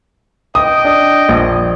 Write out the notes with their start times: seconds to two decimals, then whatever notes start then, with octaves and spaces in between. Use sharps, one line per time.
0.55 D#5 G5 D#6
0.85 D4
1.29 A#1